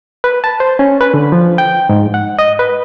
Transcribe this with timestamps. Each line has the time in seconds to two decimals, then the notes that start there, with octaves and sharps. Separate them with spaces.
0.24 B4
0.44 A5
0.60 C5
0.79 C#4
1.01 B4
1.14 D3
1.32 F3
1.58 G5
1.89 G#2
2.14 F#5
2.39 D#5
2.59 B4